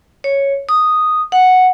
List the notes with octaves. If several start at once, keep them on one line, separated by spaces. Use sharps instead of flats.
C#5
D#6
F#5